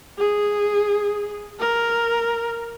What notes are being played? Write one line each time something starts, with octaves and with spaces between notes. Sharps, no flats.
G#4
A#4